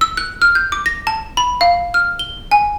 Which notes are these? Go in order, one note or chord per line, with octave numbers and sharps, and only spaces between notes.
E6
F#6
F6
G6
D6
A#6
A5
B5
F5
F6
G7
G#5